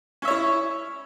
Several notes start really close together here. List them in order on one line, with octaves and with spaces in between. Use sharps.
C#4 E5 C#5 E4